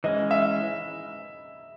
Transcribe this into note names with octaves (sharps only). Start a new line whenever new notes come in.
E3 G#3 C#4 D#5
E5